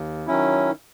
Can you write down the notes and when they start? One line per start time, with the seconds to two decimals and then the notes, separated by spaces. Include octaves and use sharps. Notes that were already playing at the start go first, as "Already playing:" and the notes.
Already playing: D#2
0.27 D#3 F#3 C#4 E4